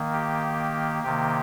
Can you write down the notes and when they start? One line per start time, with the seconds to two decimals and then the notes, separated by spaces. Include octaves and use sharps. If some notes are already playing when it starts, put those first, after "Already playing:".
Already playing: D#3 A#3
0.13 G4
1.03 C3 D#3 A#3 G4